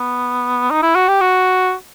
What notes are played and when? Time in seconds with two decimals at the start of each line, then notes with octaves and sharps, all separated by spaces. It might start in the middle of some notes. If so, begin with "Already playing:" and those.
Already playing: B3
0.70 D#4
0.83 E4
0.95 F#4
1.08 G4
1.21 F#4